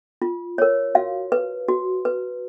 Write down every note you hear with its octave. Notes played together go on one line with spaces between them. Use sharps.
F4
A#4 C#5
F#4 F5
B4
F#4
B4